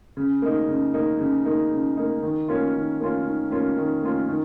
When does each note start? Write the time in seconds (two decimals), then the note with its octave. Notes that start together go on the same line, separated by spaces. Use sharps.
0.17 C#3
0.42 A#3 D#4
0.68 C#3
0.94 A#3 D#4
1.19 C#3
1.45 A#3 D#4
1.71 C#3
1.97 A#3 D#4
2.23 D#3
2.48 A#3 C#4 F4
2.74 D#3
3.00 A#3 C#4 F4
3.25 D#3
3.51 A#3 C#4 F4
3.77 D#3
4.02 A#3 C#4 F4
4.29 D#3